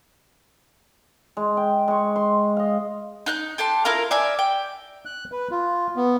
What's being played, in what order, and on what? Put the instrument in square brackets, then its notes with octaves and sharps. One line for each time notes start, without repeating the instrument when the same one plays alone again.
[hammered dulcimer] G#3
G5
G#3 C#6
C6
D#5 F5
[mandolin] D#4 F#6 G6
G4 A4 A5 C6
E4 F4 A#4 F5
D5 E5 G#5
G5
[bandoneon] F#6
B4
F4
B3